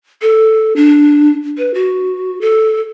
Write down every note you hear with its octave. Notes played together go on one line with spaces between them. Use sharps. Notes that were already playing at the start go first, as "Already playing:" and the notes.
A4
D4
B4
F#4
A4